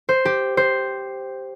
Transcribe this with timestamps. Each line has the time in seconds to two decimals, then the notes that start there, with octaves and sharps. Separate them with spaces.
0.09 C5
0.25 G4
0.57 C5